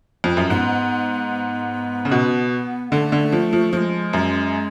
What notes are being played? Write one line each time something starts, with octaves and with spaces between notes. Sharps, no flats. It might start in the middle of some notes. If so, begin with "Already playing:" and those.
F2
F#2
G#2 B3
C#3
B2
D3 A3
D3
F3
F3
F3 G#3 A3
F#2